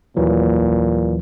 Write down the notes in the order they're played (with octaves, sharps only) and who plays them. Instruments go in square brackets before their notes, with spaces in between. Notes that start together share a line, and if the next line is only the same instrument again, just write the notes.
[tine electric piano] D#2 E3 F#3 [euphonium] A#2